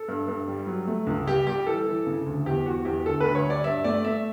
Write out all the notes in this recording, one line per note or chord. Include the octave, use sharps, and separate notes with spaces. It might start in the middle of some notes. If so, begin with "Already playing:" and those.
Already playing: A4
G2
G2
G3
F#3
A3
C#2
G3 G4
G3 G4
E3 A4
E3
C#3
D2
E2 G4
E2 F#4
E2 G4
D2 A4
D2 B4
C#5
G3 D5
G2 E5
A3 D5
A3 E5